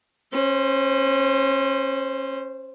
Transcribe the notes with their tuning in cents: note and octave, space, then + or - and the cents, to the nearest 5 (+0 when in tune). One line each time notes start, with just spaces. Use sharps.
C#4 -25 C5 +0